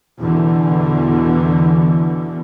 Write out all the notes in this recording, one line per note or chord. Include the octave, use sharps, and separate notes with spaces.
E2 B2 D3 E3